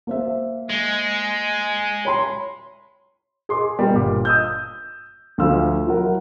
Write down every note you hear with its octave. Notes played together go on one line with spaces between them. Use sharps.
A#3 C5 E5
G#3
C#5 B5 C6
G#4 C6 D6
G3 A#3 B3
G1 A#2 D6
D#6 E6 G6
D2 F3 F4 F5 E6
F#3 E4 F#4 A#4 F#5